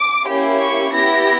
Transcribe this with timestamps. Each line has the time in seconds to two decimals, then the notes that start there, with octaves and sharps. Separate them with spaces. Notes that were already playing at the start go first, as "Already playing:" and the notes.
Already playing: D6
0.25 A#3 C#4 E4 G4
0.60 C#6
0.94 B3 E4 G4 A#6